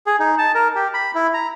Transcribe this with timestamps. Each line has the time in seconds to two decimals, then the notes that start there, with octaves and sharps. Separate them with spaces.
0.07 G#4
0.20 D#4
0.38 A5
0.55 A#4
0.75 G4
0.94 B5
1.15 E4
1.34 A#5